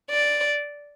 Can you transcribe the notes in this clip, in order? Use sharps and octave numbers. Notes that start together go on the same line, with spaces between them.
D5